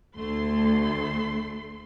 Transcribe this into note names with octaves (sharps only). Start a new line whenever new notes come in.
D2 A3 C6